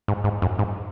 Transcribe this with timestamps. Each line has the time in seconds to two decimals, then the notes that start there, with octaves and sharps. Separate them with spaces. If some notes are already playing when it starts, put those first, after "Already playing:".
0.08 G#2
0.24 G#2
0.42 F#2
0.59 G#2